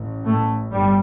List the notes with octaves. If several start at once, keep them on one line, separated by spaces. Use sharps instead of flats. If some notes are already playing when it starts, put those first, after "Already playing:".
Already playing: A1
A2 A3
G1 G2 G3